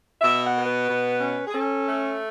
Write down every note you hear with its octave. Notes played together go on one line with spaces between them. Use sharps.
B2 E5
F#5
B3
B4
B2
C#4
G#4
C#4 A4
A3